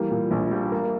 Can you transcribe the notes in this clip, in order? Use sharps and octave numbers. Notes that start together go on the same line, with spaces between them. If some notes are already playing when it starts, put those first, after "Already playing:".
Already playing: E3 G3 A#3 G4
A#2
A#1
G3
A#3